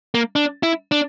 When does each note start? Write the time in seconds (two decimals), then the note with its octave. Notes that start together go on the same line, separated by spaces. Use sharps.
0.15 A#3
0.36 D4
0.63 E4
0.92 D4